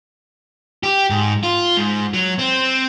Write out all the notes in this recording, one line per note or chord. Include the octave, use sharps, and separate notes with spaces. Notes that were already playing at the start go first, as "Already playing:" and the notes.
G4
G#2
F4
G#2
F#3
C4